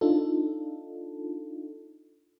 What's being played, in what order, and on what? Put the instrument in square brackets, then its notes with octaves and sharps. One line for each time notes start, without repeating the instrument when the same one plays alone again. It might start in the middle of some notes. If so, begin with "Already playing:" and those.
[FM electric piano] D4 D#4 F4 A4